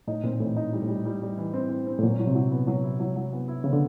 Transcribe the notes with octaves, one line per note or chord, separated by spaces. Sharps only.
A2 D#4
A#2 C4
A2 E3
D#4
G3
A2
G3
G3
G3
E3
C4
C4
C4
A2
A#2 F#3
F#3
C3
F#3
B3
F#3
E4
F#3
F#3
B3
E4
C#3 B3
D3